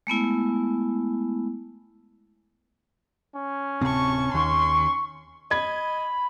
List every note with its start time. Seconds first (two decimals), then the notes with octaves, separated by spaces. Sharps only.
0.07 G#3 A3 B3 E4
3.35 C#4
3.81 D1 C3 C4 A5 C#6
4.34 D#2 D#3 C6 C#6
5.51 D#5 B5 G#6